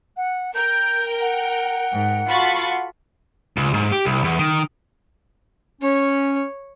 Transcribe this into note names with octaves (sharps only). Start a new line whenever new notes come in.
F#5
A#4 G5 G6
F#5
G#2
F4 F#4 A4 B5 C#6 A6
C#2
G#2
G4
C2
E2
D#3
C#4 C#5